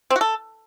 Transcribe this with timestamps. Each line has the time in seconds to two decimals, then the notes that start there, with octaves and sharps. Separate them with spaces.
0.10 C4
0.16 F#4
0.21 A4